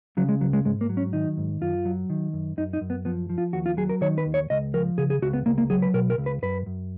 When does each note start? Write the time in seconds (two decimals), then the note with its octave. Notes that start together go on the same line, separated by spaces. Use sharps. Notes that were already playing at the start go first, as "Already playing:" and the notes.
0.17 C#3 F#3
0.29 G#3
0.41 C#2 F#3
0.53 G#3
0.65 G#2 G#3
0.81 A#3
0.89 F#3
0.97 C#4
1.13 D#3 D#4
1.37 G#2
1.61 F#2 F4
1.85 F#3
2.10 D#3
2.33 F#2
2.57 F#2 D#4
2.73 D#4
2.81 F#2
2.90 B3
3.05 F3 B3
3.29 F3
3.38 F4
3.53 D#2 F#4
3.66 F4
3.77 F#3 G#4
3.89 A#4
4.01 D#3 C#5
4.18 B4
4.26 D#2
4.34 C#5
4.50 C#2 D#5
4.74 F3 A#4
4.98 C#3 G#4
5.10 G#4
5.22 C#2 F#4
5.33 B3
5.46 C#2 A#3
5.58 A#3
5.70 F#3 G#4
5.82 B4
5.94 B2 A#4
6.10 A#4
6.18 C#2
6.26 B4
6.42 F#2 B4
6.66 F#2